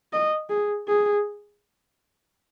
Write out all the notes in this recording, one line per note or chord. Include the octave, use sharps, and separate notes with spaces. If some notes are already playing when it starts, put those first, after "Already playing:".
D#5
G#4
G#4